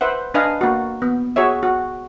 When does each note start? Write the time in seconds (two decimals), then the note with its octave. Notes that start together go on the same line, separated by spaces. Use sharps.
0.01 B4 C5 E5 F#5
0.34 D4 B4 D#5 F5 G#5
0.61 A#3 F#4
1.02 B3
1.36 F#4 G#4 C#5 E5
1.63 F#4